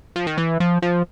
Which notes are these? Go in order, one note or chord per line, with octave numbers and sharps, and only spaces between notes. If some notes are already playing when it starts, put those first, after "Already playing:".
F3
D#3
E3
F3
F3